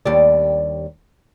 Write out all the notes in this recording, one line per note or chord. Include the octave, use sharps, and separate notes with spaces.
D#2 G3 D4